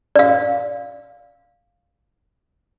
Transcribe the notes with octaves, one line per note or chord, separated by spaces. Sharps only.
D5 F5